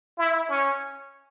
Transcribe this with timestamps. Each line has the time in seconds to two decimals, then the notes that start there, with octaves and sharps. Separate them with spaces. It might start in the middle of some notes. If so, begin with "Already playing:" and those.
0.18 E4
0.49 C#4